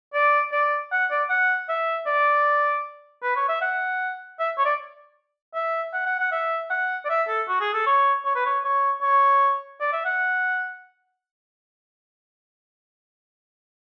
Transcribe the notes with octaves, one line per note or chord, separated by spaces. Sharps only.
D5
D5
F#5
D5
F#5
E5
D5
B4
C#5
E5
F#5
E5
C#5
D5
E5
F#5
F#5
F#5
E5
F#5
D5
E5
A4
F#4
G#4
A4
C#5
C#5
B4
C#5
C#5
C#5
D5
E5
F#5